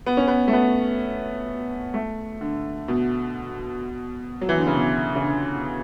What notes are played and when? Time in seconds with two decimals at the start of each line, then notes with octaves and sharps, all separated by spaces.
0.06 B3
0.17 C#4
0.28 B3
0.48 A3
0.53 B3
1.94 A3
2.41 D3
2.88 B2
4.41 F#3
4.49 E3
4.58 D3
4.67 C#3
4.74 B2
5.15 C#3
5.22 D3